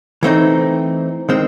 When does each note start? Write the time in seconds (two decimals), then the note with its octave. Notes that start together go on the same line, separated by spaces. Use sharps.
0.23 E3 A3 C4 D#4
1.29 D#3 G#3 C4